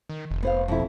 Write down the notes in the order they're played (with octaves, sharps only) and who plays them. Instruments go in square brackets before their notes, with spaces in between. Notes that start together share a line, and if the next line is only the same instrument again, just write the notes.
[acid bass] D#3
F1
[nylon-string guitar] B3 C5 F5
F2 B2 E4